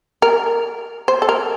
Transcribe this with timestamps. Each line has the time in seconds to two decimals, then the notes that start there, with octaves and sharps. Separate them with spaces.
0.22 A#4
1.08 C5
1.22 A4
1.29 A#4